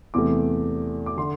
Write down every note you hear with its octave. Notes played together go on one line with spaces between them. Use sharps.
E2 C3 A3 D6
D6
D3 C6